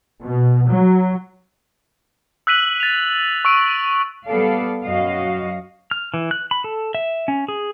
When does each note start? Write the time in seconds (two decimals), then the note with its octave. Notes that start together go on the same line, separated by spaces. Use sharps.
0.23 B2
0.67 F#3
2.47 E6 F#6 B6 D#7 F#7
2.80 A6 F7
3.45 C#6 E6 D7
4.26 G3 B3 A4 D5 F5
4.83 F#2 F#4 D#5 F5
5.91 F6
6.14 E3
6.31 F#6
6.51 B5
6.64 A4
6.95 E5
7.28 C#4
7.48 G#4